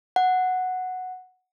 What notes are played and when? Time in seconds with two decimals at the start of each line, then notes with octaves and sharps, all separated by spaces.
0.16 F#5